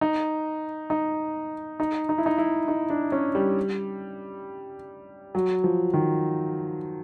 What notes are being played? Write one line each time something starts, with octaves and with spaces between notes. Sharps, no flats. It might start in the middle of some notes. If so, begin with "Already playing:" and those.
D#4
D#4
D#4
D#4
E4
D#4
E4
D#4
D4
C#4
G3
F#3
F3
D#3